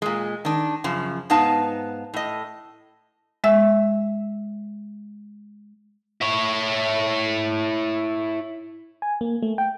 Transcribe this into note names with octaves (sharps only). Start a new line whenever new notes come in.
A#2 G#3
D#3 D4
F#2 C#3 F3
G#2 B3 D#4 F5 A5
A2 D#5
G#3 E5 E6
E4 C#5
G#5
A#3
A3
G5